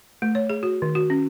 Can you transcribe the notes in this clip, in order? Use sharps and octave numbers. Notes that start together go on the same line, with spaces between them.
A3
C#5
G#4
F#4
D#3
F#4
C#4